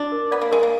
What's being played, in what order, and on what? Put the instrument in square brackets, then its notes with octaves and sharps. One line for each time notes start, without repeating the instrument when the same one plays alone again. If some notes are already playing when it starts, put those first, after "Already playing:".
Already playing: [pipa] D4 [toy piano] F#4
[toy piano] A#4
[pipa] B3 [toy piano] D5
[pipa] A#3
[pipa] G#3 [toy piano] A#4
[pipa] A#3